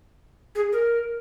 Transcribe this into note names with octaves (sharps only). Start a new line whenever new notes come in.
G#4
A#4